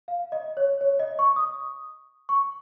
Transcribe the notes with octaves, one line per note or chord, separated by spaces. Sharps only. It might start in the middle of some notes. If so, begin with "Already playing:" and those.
F5
D#5
C#5
C#5
D#5
C#6
D#6
C#6